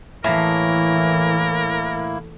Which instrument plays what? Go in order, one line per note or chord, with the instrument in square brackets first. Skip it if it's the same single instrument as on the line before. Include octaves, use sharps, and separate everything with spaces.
[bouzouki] A2 [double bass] E3 [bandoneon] A#3 E4 [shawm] A#4